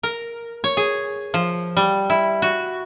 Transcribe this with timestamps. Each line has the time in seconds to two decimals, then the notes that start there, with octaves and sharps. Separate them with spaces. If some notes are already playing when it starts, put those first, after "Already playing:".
0.03 A#4
0.64 C#5
0.77 G#4
1.34 F3
1.77 G3
2.10 E4
2.42 F#4